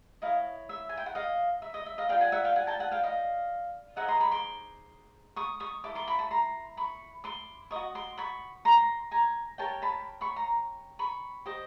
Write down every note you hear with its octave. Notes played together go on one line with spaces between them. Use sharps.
E4 G#4 C#5 D#5 F5
E5
G#5
G5
F#5
D#5 F5
E5
D#5
E5
D#5 F5
F4 A#4 D5 F5 G5
F#5 G#5
E5 F#5
F5 G5
F#5 G#5
G5 A5
F#5 G#5
F5 G5
D#5 F5
D#4 G#4 C5 D#5 E5 F#5
A#5 C6
B5 C#6
C6 D6
C#6 D#6
C#6 D#6
E4 A4 D6
C6 D6
B5 C#6
A5 B5
A#5 C6
B5 C#6
C6 D6
F#4 B4 D#5 C#6 D#6
C6 D6
B5 C#6
A#5 C6
G#5 A#5
G4 A#4 C#5 G5 A5
A5 B5
B5 C#6
A#5 C6
B5 C#6
G4 C5 D#5